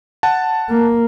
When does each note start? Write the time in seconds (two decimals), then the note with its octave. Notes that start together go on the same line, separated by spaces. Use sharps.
0.23 F#5 A5
0.70 A#3